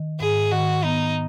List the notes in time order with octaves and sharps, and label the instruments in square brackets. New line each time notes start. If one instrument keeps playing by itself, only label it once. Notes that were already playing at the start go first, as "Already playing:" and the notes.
Already playing: [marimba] D#3
[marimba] G#2 [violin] G#4
[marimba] D#3 [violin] F#4
[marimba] B3 [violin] D#4